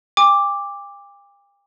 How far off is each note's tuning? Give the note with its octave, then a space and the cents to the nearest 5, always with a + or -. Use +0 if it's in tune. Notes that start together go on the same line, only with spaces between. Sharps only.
G5 +45 D6 +0